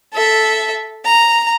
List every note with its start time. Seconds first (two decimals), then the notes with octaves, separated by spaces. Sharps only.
0.14 A4 E5
1.05 A#5